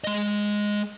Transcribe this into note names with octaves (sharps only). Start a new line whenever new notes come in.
G#3 D#5